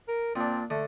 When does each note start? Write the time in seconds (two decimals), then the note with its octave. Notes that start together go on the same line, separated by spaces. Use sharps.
0.08 A#4
0.36 A#2 C4 D4
0.70 D3 A3